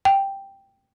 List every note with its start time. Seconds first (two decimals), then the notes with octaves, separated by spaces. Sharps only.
0.05 G5